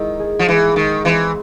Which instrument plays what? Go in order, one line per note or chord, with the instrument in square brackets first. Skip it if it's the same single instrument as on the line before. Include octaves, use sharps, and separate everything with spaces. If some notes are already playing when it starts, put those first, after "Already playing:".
Already playing: [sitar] D#3 [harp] G#3 E4
[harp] G#4
[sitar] F3
[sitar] E3 [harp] G#3
[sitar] D#3 [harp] G#3
[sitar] E3 [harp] C4